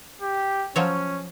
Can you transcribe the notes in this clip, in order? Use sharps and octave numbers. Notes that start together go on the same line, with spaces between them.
G4
F3 F#3 C#4 C#5